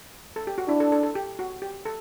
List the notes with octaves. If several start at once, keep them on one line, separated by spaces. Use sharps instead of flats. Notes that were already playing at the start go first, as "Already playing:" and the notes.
A4
G4
F#4
D4 E4
A4
A4
A4
G4
F#4
G4
A4